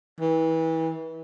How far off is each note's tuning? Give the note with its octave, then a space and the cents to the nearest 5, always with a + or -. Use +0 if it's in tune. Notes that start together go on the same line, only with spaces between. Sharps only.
E3 -30